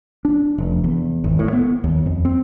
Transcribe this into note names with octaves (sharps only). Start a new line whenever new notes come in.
D4
F1
E2
G#1
A2
B3
D#2
F2
C4